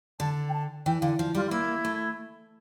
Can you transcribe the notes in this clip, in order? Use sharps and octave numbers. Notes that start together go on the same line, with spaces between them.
D3 A5
G5
A5
E3 G5
D3 F5
F3
G3 F4
F4
A#3 E4
A3